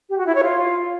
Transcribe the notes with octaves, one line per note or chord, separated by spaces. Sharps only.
G4
F#4
E4
C#5
F4